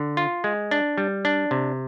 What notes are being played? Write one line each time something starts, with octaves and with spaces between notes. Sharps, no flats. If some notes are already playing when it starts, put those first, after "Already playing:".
Already playing: D3
F4
G#3
D4
G3
D4
C3